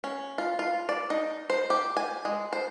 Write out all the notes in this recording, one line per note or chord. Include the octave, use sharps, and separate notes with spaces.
C#4
F4
F4
D5
D#4
C5
G4
G#5
G#3
C5